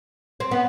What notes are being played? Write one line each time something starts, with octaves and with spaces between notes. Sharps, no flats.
C4
B3